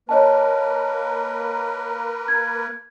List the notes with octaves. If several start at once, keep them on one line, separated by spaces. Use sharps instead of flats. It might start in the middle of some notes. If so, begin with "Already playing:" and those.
A#3 A#4 B4 C#5 D#5 A5
G#6